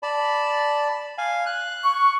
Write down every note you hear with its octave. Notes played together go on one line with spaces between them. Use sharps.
D5 A5 B5
F5 G#5
F#6
C#6